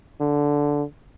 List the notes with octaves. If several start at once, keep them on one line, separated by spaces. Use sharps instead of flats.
D3